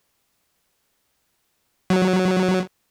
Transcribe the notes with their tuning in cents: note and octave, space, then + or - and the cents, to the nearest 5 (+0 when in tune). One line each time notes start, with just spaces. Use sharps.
F#3 -5